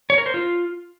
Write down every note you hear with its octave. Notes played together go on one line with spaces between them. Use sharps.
C#5
A#4
C5
F4